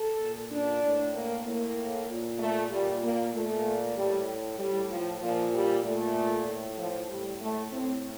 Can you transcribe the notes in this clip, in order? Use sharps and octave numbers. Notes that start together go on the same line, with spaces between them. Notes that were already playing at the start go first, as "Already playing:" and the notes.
Already playing: A4
A#2
D4
A2
A#3
A2 A#3
A#2
A3
A#2 G3
A#3
A#2 A3
A2 G3
A2 G3
F3
A#2 F3
G3
A#2 A3
A2
F3
A2 G3
A3
A2 C4